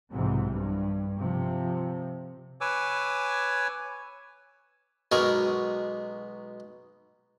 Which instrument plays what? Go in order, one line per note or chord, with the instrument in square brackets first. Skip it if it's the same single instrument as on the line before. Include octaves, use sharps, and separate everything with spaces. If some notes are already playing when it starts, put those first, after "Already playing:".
[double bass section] B1 G#2 C3 E3
G2
C3 F3
[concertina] B4 C#5 G#5 D6 E6
[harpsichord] B1 B2 G#3 A#4 C#5 G#5